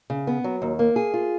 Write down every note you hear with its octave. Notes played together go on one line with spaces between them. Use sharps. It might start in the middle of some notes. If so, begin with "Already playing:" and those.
C#3
B3
F#3
D#2
A#3
G#4
F4